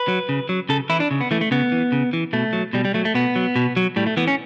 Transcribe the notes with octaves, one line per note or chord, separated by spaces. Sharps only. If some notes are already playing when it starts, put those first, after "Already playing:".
Already playing: B4
F#3
C#3
F#3
C#3 A4
E3 E4
D4
C#3
B3
E3 A3
A3
C#3 B3
E3
C#3
E3
B2 A3
F#3
B2 G3
G3
F#3 A3
A3
B2 B3
F#3
B2
F#3
A2 G3
A3
E3 B3
C#4